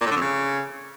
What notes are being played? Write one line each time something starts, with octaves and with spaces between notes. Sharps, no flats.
A#2
A2
D3
F2
C#3